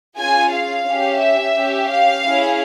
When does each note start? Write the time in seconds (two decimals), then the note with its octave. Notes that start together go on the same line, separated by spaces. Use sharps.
0.17 C#4 F4 G#4 G#5
0.52 F5
0.86 C#4 G4
1.20 E5
1.55 C#4 G4
1.89 F5
2.24 C#4 E4 G#4